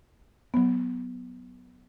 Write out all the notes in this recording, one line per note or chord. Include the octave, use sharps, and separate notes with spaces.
F#3 B3